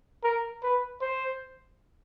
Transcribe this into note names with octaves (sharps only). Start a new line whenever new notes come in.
A#4
B4
C5